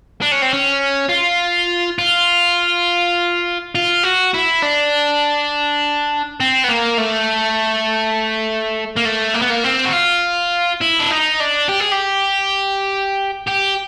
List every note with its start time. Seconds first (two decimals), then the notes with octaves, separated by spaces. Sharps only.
0.22 D4
0.32 C#4
0.42 C4
0.54 C#4
1.09 F4
1.99 F4
3.75 F4
4.04 F#4
4.34 E4
4.62 D4
6.40 C4
6.64 B3
6.69 A#3
6.98 A3
8.96 A#3
9.05 A3
9.34 A#3
9.42 B3
9.50 A#3
9.64 C4
9.85 F#4
9.92 F4
10.81 E4
11.00 D4
11.11 D#4
11.40 D4
11.69 G4
11.80 G#4
11.92 G4
13.47 G4